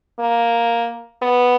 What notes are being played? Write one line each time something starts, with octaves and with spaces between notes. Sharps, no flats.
A#3
B3